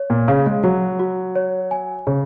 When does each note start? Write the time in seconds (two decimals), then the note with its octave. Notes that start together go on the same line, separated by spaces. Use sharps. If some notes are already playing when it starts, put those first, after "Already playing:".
Already playing: C#5
0.10 A#2
0.28 C#3 F5
0.46 G#3
0.64 F#3 F#4
0.99 F#4
1.35 C#5
1.71 G#5
2.07 C#3 G#4